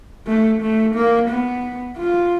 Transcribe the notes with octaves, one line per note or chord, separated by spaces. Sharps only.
A3
A3
A#3
B3
F4